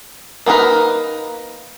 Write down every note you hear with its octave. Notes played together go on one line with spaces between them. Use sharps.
A#3 B3 D#4 A#4 B4